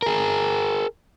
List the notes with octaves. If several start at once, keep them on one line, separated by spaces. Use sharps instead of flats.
G#4 A#4